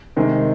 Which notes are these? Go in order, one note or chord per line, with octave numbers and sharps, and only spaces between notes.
C3 D#3 G#3